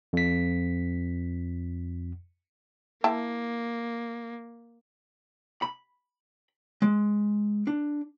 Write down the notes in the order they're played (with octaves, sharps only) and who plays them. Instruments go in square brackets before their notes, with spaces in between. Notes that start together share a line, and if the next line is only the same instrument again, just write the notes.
[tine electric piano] F2 B6
[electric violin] A#3 [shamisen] E4 G5 A5
[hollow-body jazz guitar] B5
G#3
D4